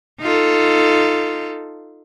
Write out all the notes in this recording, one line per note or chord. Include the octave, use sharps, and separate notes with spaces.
D#4 F4 A4